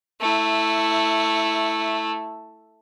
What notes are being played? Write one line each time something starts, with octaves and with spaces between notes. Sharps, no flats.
A3 E4